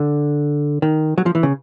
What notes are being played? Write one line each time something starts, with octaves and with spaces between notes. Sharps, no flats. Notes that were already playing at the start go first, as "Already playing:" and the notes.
Already playing: D3
D#3
F#3
F3
E3
C#3